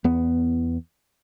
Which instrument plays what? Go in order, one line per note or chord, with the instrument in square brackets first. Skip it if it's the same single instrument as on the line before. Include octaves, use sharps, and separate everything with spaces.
[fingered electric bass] E2 B3